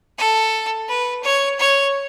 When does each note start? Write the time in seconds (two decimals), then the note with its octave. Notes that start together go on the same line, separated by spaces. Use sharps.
0.18 A4
0.88 B4
1.23 C#5
1.59 C#5